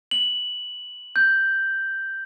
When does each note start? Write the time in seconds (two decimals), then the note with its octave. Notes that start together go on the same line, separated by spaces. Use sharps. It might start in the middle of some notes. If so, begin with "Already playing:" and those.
0.11 F#7
1.16 G6